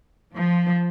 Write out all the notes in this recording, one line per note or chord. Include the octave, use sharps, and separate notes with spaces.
F3